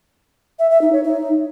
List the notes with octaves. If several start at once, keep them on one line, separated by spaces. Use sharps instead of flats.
E5
E5
D#4
C#5
D#4